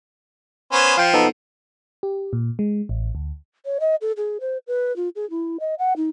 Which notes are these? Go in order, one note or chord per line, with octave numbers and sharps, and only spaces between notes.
B3 C#4 C5
F3 F5 G5
B3 D#4 A4
G4
A#2
G#3
A1
D2
C#5
D#5
A4
G#4
C5
B4
F4
G#4
E4
D#5
F#5
D#4